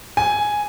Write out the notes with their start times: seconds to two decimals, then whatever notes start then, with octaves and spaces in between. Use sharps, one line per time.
0.17 G#5